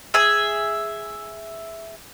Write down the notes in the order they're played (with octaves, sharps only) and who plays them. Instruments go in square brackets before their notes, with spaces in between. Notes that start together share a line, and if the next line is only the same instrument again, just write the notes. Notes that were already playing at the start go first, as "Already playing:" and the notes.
[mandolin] G#4 E5